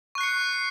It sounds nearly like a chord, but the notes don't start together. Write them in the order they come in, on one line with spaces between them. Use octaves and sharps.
C#6 F#6 C7 C#7